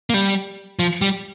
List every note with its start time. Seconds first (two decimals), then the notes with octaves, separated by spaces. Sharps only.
0.10 A#3
0.14 G3
0.79 F3
1.02 G3